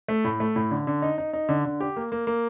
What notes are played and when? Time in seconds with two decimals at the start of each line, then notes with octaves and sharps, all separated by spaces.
0.08 A3
0.24 A2
0.40 A3
0.56 A2
0.71 D3
0.87 D3
1.02 D#4
1.18 D#4
1.33 D#4
1.49 D3
1.65 D3
1.80 G4
1.96 A#3
2.12 A#3
2.27 A#3